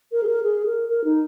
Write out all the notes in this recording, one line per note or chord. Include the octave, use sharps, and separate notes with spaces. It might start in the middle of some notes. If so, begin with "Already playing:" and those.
A#4
G#4
A#4
G#4
A#4
A#4
D#4